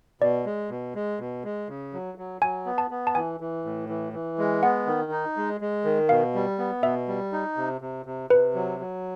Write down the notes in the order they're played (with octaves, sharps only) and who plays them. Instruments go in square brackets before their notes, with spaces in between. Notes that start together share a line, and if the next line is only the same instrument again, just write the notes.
[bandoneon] B2 [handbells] D5
[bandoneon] G#3
B2
G#3
B2
G#3
C#3
F#3
F#3
[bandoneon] F#3 [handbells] G#5
[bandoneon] B3
[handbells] A5
[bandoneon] B3
[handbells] A5
[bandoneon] E3 [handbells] G#5
[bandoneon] E3
A2
E3
E3
G#3
[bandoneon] B3 [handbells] F#5
[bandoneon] D#3
D#4
G#3
G#3
D#3
[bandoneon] B2 [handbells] F5
[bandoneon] G3
B3
[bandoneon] B2 [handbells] E5
[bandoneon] G3
D#4
C3
C3
C3
[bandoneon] C3 [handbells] B4
[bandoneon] F#3
F#3